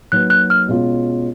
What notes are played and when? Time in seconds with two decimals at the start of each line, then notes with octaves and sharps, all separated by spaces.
0.12 F#3 A#3 D#4 F#4 B4 F#6
0.30 F#6
0.50 F6
0.68 B2 G#3 C#4 F4